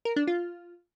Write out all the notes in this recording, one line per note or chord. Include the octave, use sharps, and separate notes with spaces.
A#4
D4
F4